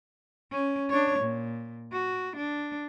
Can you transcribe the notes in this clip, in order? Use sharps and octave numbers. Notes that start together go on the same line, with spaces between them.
C#4
D4 C#5
A#2
F#4
D4